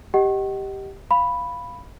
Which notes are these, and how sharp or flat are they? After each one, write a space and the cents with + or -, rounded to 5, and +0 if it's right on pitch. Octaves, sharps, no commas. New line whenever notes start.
G4 +0 D#5 +0 F#5 +40
F5 +0 B5 +0